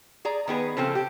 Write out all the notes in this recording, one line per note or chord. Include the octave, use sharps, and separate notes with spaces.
G#4 D5 A#5
D#3 B3 G#4 B4
C#3 F3 C4 C#4 A4
G4